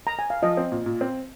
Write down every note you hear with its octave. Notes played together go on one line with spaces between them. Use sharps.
A#5
G#5
F5
F3 D#5
C4
A#2
A#2
C4